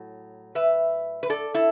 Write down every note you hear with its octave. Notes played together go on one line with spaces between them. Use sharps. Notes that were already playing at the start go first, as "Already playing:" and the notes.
Already playing: A2 F#3
B4 E5
B4
A4 D5
E4 A4